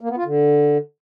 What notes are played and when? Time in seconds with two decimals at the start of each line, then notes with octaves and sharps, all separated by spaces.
0.01 A#3
0.09 B3
0.17 F4
0.25 D3